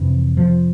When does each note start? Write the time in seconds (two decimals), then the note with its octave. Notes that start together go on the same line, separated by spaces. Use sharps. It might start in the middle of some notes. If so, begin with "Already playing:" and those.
Already playing: F2 C3 E3
0.37 F3